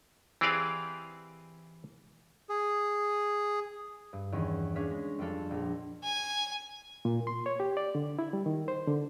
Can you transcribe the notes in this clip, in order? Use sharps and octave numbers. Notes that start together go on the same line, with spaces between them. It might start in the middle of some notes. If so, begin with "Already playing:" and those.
E3 C4 G4 G#4 D5 F5
G#4
G2
E2 D#3 C#4
C#4 D4 G#4 F5 B6
G#3
F2 G3 D4 A4 F5
A#1
G#5
A#2
C6
C#5
G4
D5
D3
E4
G3
D#3
C5
D3